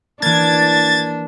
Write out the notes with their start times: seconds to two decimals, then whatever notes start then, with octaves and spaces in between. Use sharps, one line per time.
0.22 E3 A#3 D4 G#6 A6